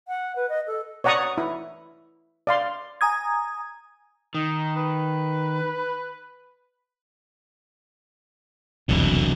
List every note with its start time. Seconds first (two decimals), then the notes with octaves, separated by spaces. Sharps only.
0.08 F#5
0.36 B4
0.49 D#5
0.67 A4
1.04 C#5 D5 F#5 A#5 C#6 D#6
1.38 E4
2.47 D5 F5 C6
3.01 G#5 A#5 D#6 G#6
4.35 D#3 D#4
4.76 B4
8.89 E1 C2 F2 D3 F#3